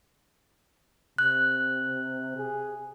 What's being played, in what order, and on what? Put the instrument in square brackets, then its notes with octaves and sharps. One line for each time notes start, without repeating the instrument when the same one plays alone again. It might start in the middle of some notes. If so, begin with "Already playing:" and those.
[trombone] C3 [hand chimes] F#6
[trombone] G#4